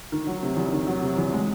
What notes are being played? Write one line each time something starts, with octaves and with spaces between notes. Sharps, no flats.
D#3
F#3
C3
E2
D#3
F#3
C3
E2
G#3